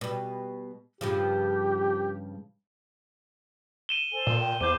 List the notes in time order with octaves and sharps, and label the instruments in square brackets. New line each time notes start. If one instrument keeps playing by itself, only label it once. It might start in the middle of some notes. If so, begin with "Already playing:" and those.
[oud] B2 G3
[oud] G2 C#3 F3 [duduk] G4
[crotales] D#7 E7 G7
[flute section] A4 C5 G#5
[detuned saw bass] A#2
[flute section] G5
[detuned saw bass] E2 [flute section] C5 D6 [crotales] G6 D#7